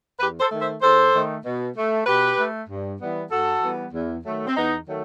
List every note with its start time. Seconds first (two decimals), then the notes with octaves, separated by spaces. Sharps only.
0.19 E2 G4 B4
0.39 A4 C5
0.50 D#3 A3
0.61 C5 E5
0.81 E2 A4 C5
1.13 D#3 A3
1.44 B2
1.75 A3
2.06 B2 G4 B4
2.37 A3
2.68 G2
2.99 E3 G3 B3
3.30 G2 F#4 A4
3.62 E3 G3 B3
3.93 E2
4.24 D#3 F#3 A3
4.46 C4
4.56 E2 B3 D#4
4.87 D#3 F#3 A3